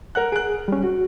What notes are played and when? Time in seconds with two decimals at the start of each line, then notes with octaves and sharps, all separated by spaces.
0.15 A#4 F#5 F#6
0.32 G#4 F#6 D7
0.68 G3 C#4
0.84 F#4